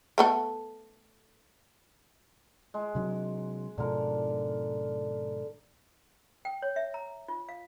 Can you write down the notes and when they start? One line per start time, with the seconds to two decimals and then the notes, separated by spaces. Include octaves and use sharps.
0.18 A3 B3 A4
2.74 G#3
2.95 C3 F#3 D4
3.78 G#2 B2 D3 F3 A#4
6.45 G5
6.62 C#5
6.76 E5
6.94 A#5
7.28 F4
7.49 F5